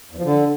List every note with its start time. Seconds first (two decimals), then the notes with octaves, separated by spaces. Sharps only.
0.11 E2
0.18 F3
0.24 D3